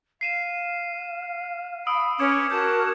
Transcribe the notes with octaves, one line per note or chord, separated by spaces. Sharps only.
F5 C7 D#7 E7
B5 D#6 E6 D7
C#4 B4 D6 G#6 C#7
F#4 A#4 A5 G6 G#6 E7